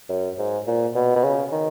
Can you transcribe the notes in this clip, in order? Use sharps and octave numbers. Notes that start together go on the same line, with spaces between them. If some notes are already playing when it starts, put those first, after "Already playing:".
F#2
G#2
A#2
B2
B2
C#3
D#3